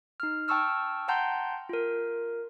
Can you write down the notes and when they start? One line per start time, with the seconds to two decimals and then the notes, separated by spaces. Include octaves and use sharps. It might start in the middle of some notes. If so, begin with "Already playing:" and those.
0.20 D#4 F6
0.48 G5 A5 C#6 E6 F6
1.08 F#5 G5 A5 A#5 C6 G6
1.69 F4 A#4